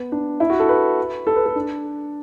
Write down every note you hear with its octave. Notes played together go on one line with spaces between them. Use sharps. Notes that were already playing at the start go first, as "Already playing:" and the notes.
Already playing: B3
D4
E4
F#4
A4
B4
A4
B4
A4
D4